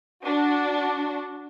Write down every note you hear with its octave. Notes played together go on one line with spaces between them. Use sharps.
D4 F#4